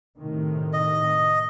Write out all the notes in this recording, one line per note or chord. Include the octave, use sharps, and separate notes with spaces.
A2 C3 D#3
D#5